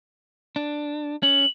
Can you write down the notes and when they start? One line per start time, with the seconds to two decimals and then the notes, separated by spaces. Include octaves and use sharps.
0.56 D4
1.23 C#4 F#7